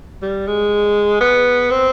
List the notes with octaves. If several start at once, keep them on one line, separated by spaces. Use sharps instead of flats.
G3
G#3
B3
C4